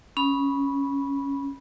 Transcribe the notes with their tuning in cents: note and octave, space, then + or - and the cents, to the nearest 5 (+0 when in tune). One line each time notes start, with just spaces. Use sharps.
C#4 +0 B5 -10